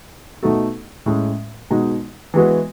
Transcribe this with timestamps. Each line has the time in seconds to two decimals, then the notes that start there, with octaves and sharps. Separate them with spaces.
0.43 B2 A3 D#4 F#4 A4
1.06 A2 G#3 C#4
1.70 B2 G#3 D#4 F#4
2.34 E3 G#3 B3 F#4 B4